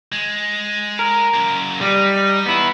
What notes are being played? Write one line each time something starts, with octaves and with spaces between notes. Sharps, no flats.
G#3
A#4
F#2 A#3
G3 D#4
B3 E4